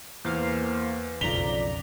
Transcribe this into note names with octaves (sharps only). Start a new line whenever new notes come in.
E2 A#3 C5 F5
B1 F2 C#3 D5 A#5 B6 F7 G7